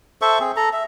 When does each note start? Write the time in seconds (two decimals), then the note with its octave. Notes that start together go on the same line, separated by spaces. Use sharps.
0.22 A4 C5 E5 C#6
0.40 C4 G#4
0.56 A4 A#5
0.73 E5